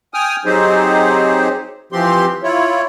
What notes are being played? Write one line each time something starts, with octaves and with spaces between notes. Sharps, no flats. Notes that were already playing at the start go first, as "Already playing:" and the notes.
G5 G#5 D#6 F6
F#3 C4 D#4 G4 G#4 C5
E3 F3 C4 G4 C6
E4 F4 C#5